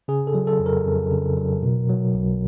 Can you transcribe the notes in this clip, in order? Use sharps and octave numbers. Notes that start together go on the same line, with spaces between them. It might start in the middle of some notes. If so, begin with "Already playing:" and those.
C#3 G#4
A4
F#3
A4
F2
A#4
F2
C#3
F#3
B2
F#3
B1